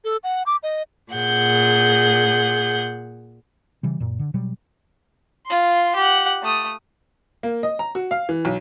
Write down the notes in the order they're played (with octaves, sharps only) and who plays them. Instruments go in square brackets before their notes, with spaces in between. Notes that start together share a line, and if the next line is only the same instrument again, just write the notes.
[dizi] A4
F#5
D6
D#5
[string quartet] A#2 G#4 F#5 G6
[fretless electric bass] C#3 E3 G3
F#2 A#2
D3
B2 F#3 G3
[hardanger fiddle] F4 C6
G4 F#5
A3 D#6
[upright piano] A#3
D#5
A#5
F#4
F5
E3
B1